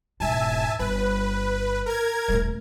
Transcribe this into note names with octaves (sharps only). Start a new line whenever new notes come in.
E1 G#2 E5 G#5 A5
G1 B4
A#4 G#6
D#1 A3